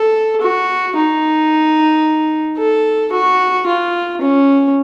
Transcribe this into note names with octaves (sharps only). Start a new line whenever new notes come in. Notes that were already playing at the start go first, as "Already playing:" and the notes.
Already playing: A4
F#4
D#4
A4
F#4
F4
C#4